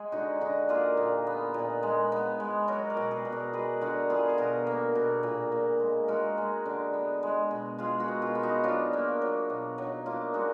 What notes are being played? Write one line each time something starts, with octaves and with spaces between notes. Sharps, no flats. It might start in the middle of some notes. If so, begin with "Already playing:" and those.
Already playing: G#3 G#4
D3 D#4 F#4
D3 D#4 F#4
A#3 F4 G#4
A#2
B3
A#2
G#3
B3
G#3
F#3 F#4 A#4
A#4 D5
B2
G#4 B4
B2
A#4 D5
G#3 G#4 B4
D3 F#4 A#4
B3 F4 G#4
G#4
B2 F#4 A#4
A#3
B2
A#2
A#2
G#3
G#3 F#4 A#4
G#3
D3
B3
G#3
B2
G#3 F4 G#4
F#4 A#4
B2
F4 G#4
B3
D#4 F#4
F#3 D4 F4
A#3
F#3
B2
F#3 D#4
A#3 D4 F4
G#3 D#4 F#4